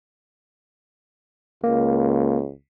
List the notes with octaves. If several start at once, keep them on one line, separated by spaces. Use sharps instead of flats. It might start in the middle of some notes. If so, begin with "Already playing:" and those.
C#2 A#3